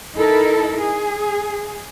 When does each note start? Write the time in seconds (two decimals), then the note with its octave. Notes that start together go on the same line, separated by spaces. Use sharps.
0.16 D#4 E4 A4 A#4
0.80 G#4